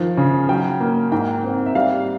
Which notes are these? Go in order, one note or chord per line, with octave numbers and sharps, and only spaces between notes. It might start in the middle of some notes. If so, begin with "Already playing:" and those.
Already playing: D#3 F3
C#3
F#3 G5
A#3
G#2 G5
C4
E5
G3 F5